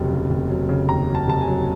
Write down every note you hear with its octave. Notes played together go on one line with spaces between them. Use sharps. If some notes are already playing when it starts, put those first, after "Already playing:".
Already playing: F1 D#2 C#3 F#3
C#3
F1
F#3
C#3
D#2 A#5
F#3
A5
F1 A5
G#5
F#3